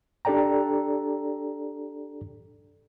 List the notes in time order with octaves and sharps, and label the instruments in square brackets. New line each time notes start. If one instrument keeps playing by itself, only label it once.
[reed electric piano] D4 G4 A4 D5 G5 A#5